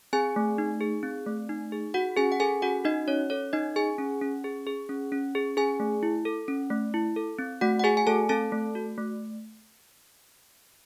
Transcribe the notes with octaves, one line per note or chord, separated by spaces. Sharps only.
C4 G#4 G#5
A3
D#4
G#4
C4
A3
D#4
G#4
F#4 F#5
C#4 G#4 G#5
F#5
G#4 A4 G#5
C#4 F#4 F#5
D#4 F#4 D#5
C#4 C#5
A4 C#5
C#4 D#4 D#5
G#4 G#5
C#4
C#4
G#4
G#4
C#4
C#4
G#4
C#4 G#4 G#5
A3
E4
A4
C#4
A3
E4
A4
C4
A3 F#4 F#5
F#5
F#4 G#4 G#5
G#5
A3 A4 A5
C4 A4 A5
A3
F#4
A3